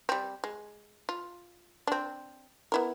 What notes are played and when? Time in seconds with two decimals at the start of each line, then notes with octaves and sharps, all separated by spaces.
0.09 G3 C4
0.44 G#3
1.09 F4
1.87 C4 D4
2.72 B3 E4 A#4